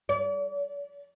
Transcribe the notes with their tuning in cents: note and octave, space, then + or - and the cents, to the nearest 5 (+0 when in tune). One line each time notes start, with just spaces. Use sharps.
D5 -40